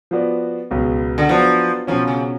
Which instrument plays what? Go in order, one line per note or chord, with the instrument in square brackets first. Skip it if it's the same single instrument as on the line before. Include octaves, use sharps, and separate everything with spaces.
[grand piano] F3 B3 F#4 B4 D5
C#2 B2 F#3 B3
[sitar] D3
[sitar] F3 [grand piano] F#3 B3 F#4 B4 D5
[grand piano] B2 F#3 C#4 [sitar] F3
[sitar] C#3